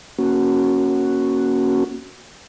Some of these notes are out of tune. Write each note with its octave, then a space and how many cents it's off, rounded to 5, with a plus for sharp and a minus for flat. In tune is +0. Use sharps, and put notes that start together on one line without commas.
A#3 +20 C#4 +0 F#4 +0